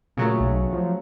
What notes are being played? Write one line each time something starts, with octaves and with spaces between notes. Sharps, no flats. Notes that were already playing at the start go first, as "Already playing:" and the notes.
A#2 C#3 F#3 A3
B1
F3